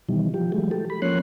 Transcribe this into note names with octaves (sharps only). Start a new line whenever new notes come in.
B2 D#3 E3 G3
F3 G4
E3 F#3 G#3 A3
G4 A4
B5
F3 A#3 C#4 C#5 C6 F#6